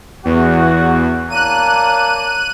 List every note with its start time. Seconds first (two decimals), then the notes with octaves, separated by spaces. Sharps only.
0.25 E2 F#4
1.30 A#3 D4 C#5 F#6 D#7